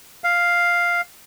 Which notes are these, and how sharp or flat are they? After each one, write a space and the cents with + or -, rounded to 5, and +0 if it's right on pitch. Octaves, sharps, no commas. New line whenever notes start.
F5 +0